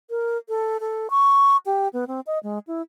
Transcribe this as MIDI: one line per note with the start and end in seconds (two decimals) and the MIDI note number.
0.10 0.37 70
0.49 0.77 69
0.80 1.07 69
1.10 1.57 85
1.66 1.88 67
1.93 2.05 59
2.07 2.20 60
2.27 2.39 75
2.43 2.59 56
2.67 2.82 64